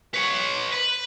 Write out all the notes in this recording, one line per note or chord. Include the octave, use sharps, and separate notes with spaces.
B4 C#5
B4